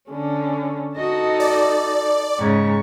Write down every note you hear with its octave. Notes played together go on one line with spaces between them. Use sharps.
D3 C#4
D#4 F#4 A4 D#5
D5
G#2 C#3 C#6